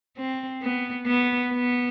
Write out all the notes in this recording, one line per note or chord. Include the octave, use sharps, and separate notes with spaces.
C4
B3
B3
B3